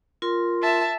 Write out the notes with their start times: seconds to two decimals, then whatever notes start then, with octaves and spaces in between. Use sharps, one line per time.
0.22 F4 A#4 C6
0.63 E5 A5